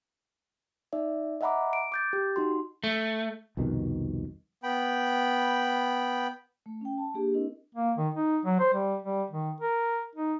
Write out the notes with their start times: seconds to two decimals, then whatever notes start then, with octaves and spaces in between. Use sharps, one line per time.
0.93 D#4 D5 E5
1.41 D#5 E5 F#5 A#5 B5 D6
1.73 D7
1.92 D6 G6 A6
2.13 G4
2.36 D#4 F#4 C6
2.84 A3
3.57 C2 F2 B2 D#3
4.63 B3 G5 B5
6.66 A3
6.81 C#4 G5
6.98 A5
7.14 A#3 D4 G4 G#4
7.34 C4 D4 E4 A#4 D#5
7.75 A#3
7.98 D#3
8.15 D#4
8.45 F#3
8.60 C5
8.74 G3
9.03 G3
9.31 D#3
9.61 A#4
10.16 D#4